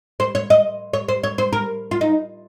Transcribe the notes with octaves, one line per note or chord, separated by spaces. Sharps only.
C5
C#5
D#5
C#5
C5
C#5
C5
A#4
F4
D#4